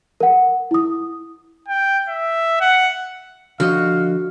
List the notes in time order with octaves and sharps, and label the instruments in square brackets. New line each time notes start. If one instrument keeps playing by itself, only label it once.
[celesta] A#4 F#5
E4 D#6
[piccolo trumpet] G5
E5
F#5
[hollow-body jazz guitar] D3 F3 D#5 [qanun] F#4 [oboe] F5